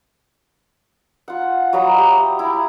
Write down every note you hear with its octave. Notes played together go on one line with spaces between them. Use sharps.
F4 F#5
F#3 D#5 A#5 B5
G4 E5
E4